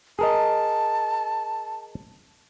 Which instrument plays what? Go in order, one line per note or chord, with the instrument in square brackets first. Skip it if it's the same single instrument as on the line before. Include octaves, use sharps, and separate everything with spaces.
[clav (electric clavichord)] G#4 A#4 D#5 [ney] A5